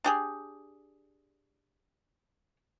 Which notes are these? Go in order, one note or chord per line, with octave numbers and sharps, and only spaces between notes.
D4 G4 G#4